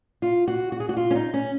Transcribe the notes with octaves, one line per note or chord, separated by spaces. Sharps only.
F4
F#4
F#4
G#4
F#4
F4
C#4
D#4
C#4